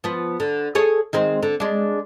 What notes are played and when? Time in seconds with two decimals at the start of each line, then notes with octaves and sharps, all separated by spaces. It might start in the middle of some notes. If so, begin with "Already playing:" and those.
0.04 F3 B3
0.40 D3
0.75 G#4 A4 C#5
1.13 D#3 G#3 C4
1.43 D3
1.60 G#3 D4